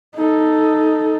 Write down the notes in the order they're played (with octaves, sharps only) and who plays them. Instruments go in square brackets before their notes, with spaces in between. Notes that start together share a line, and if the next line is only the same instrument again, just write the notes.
[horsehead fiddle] D#4 A4